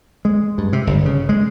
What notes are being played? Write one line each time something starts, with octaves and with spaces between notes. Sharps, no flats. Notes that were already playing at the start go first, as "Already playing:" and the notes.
G#3
G2
C3
G1
C#3
G#3